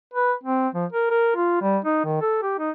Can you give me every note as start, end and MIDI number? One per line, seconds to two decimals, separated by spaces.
0.13 0.33 71
0.43 0.68 60
0.75 0.86 53
0.92 1.07 70
1.11 1.34 70
1.36 1.61 65
1.61 1.78 55
1.85 2.04 63
2.04 2.19 51
2.21 2.38 69
2.42 2.56 67
2.58 2.71 63